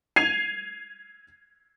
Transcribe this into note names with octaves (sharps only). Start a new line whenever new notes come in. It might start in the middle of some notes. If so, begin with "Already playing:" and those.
G#6 C7 D#7 F7